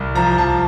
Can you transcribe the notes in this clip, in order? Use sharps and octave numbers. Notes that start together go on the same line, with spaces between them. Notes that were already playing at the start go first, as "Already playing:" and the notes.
Already playing: C2
F3 A#5
C2 A5